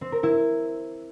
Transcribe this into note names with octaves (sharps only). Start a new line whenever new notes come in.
C4
A#4
E4